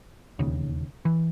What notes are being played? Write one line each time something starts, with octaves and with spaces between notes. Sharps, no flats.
E1 D#2 C#3
E3